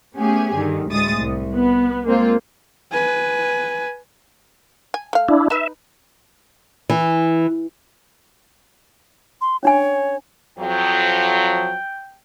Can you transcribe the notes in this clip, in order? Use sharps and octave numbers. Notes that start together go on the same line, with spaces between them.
A3 B3 C#4 G4 G#4 G#5
G2 D3 D#3
D2 A2 G#3 D#6 A6
C2
B3
G#3 A#3 C4 F4
B4 G#5
G#5
A3 F5
D4 E4
D#4 B4 E5
E3
C6
C#4 D4 C#5 G#5
F2 F3 F#3 G5